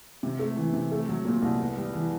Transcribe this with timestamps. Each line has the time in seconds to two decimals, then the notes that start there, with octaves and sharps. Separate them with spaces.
0.23 C3
0.39 A3
0.57 E3
0.73 C3
0.92 A3
1.09 F#3
1.25 A#2
1.42 C2
1.59 B3
1.77 G3
1.94 E3